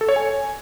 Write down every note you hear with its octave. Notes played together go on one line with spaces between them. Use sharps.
A4
C#5
G#5